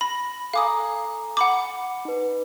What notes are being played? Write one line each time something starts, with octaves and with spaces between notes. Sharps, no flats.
B5 A#6
A4 F5 G#5 A#5 D6 D#6
F#5 B5 D6
D#4 B4